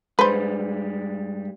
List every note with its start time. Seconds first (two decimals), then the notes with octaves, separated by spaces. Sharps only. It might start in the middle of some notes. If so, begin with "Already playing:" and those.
0.19 G2 G3 G#3 B4 C5